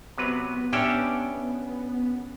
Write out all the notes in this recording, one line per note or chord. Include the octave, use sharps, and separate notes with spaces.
C3 F#3 B3 B4
C#4 D4 G4 C#5 E5 G5